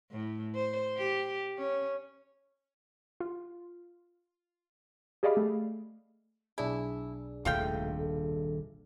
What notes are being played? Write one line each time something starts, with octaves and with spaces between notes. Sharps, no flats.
A2
C5
G4
C#4
F4
G4 G#4 D5 D#5 F5 B5
A3
B1 D4 E4 G#4
D#1 D#2 C3 A3 F4 F5 G5
A4